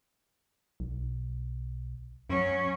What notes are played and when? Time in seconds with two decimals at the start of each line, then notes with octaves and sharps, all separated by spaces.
0.80 B1
2.29 F#2 F#3 C#4